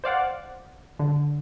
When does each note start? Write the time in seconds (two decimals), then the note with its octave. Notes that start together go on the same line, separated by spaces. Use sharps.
0.04 C5 D5 F5 F#5
0.99 D3